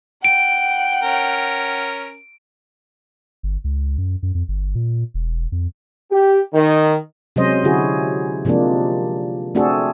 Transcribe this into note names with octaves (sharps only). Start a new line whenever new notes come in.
F#5 G5 D7
C#4 A#4
G1
C#2
F#2
F#2
F2
G1
A#2
E1
F2
G4
D#3
C3 F#3 G#3 C#4 C5 D#5
D3 E4 F#4 G#4
C3 F3 G#3 A#3 D4
A3 C4 D4 F#4 G#4 A4